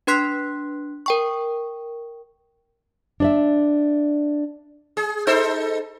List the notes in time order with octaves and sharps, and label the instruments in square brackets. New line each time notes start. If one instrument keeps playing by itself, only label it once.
[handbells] D4 B4 C6 F#6 B6 C7
A#4 G5 C#6
[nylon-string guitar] D4 D5 E5
[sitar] G#4
D#4 A4 C5